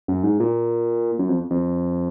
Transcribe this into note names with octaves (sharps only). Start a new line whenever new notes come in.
F#2
G#2
A#2
F#2
F2
F2